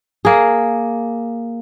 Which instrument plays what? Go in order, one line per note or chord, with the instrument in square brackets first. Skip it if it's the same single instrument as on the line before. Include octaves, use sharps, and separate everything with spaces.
[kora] A#3 G#4